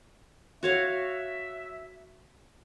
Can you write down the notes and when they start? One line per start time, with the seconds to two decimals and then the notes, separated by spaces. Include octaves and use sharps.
0.63 F#4 C#5 E5 F5